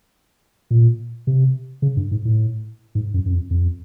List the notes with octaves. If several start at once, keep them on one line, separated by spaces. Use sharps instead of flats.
A#2
C3
C#3
G2
G#2
A2
G#2
F#2
F#2
F2
F2